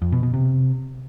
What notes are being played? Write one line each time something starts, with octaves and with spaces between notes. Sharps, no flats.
F2
B2
B2
C3